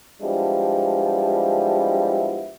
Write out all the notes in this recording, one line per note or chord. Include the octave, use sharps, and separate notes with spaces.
F3 G3 G#3 B3 D4 E4